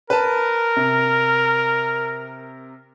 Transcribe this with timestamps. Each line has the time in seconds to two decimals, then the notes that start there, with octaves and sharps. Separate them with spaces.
0.10 A#4 B4 A5
0.77 C3